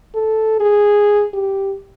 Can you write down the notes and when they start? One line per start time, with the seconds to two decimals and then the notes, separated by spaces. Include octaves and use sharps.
0.15 A4
0.60 G#4
1.33 G4